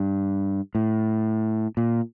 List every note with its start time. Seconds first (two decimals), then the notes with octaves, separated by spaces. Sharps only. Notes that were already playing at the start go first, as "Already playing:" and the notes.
Already playing: G2
0.75 A2
1.77 A#2